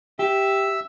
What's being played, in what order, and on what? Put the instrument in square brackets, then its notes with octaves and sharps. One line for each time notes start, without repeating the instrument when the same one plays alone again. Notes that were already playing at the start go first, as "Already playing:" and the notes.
[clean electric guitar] G4 [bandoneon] E5 E6